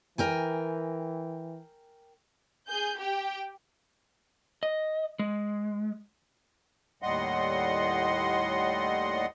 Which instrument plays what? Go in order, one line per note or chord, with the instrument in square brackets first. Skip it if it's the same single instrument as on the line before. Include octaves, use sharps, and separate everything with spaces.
[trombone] E3 [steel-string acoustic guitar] A#4 G5 G#5
[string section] G#4 G6
G4 G5
[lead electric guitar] D#5
G#3
[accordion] D#2 A2 G3 D#5 F#5 C6